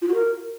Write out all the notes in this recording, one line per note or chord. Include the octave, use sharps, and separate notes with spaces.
F4
F#4
A#4